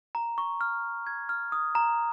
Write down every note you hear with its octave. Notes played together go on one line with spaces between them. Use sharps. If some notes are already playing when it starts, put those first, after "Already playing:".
A#5
C#6
F6
G#6
F6
D#6
A#5